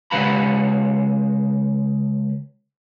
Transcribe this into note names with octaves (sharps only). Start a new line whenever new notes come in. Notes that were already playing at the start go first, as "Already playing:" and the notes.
C#3 G#3 B4 F#5 A#5 B5